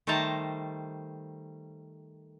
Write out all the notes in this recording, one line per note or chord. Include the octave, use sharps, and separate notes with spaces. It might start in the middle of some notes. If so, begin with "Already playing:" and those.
D#3 G3 A3 C5 A5 A#5